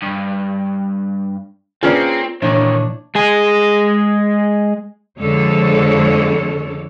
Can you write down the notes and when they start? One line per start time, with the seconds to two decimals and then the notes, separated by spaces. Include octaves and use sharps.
0.03 G2
1.83 A#3 C4 C#4 F4 G#4 B4 D5
2.42 C#2 A#2 D#3 E3 D4 C#5
3.15 G#3 G#4
5.18 F2 D3 G#3 A4 C#5